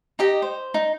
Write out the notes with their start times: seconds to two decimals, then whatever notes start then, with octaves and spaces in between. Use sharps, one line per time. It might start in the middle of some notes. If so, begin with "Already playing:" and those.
0.19 D#4 G4 D#5
0.42 C5
0.74 D#4